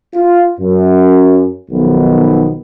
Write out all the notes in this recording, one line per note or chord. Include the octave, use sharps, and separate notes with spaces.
F4
F#2
B1 D#3 F3 B3